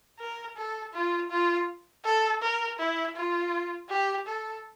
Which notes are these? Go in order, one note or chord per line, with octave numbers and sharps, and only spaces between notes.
A#4
A4
F4
F4
A4
A#4
E4
F4
G4
A4